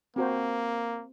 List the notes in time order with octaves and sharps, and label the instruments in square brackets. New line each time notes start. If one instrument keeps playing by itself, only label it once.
[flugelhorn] A#3 [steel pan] C4 F#4 C5